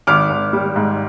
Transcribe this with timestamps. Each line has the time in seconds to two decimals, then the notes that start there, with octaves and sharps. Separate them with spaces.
0.07 G#1 D6 F6
0.30 G#1
0.53 G3
0.76 G#2